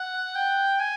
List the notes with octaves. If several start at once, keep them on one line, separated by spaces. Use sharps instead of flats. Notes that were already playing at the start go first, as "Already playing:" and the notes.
Already playing: F#5
G5
G#5